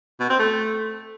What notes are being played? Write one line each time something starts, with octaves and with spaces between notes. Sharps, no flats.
B2
C4
A3